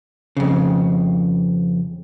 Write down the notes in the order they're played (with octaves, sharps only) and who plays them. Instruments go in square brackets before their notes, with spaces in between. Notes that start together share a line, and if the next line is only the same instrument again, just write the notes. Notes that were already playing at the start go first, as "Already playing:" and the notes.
[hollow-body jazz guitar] F2 C#3